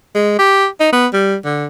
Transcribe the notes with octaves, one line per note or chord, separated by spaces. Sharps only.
G#3
G4
D#4
B3
G3
D3